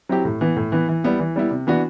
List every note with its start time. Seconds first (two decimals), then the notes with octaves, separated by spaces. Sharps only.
0.09 F#3 C4 E4 G4
0.25 A2
0.41 E3 B3
0.56 A2
0.72 E3 B3
0.89 E3
1.04 G3 B3 E4
1.20 E3
1.36 G3 B3 E4
1.51 C3
1.67 E3 B3 D4 F#4